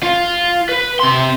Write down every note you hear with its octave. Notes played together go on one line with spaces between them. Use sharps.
F4
B4
C3 C6